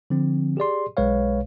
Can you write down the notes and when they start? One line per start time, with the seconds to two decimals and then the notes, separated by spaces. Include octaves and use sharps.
0.10 D3 F3 C4
0.57 G4 G#4 D5 C6
0.97 B1 G#3 B4 C#5 F5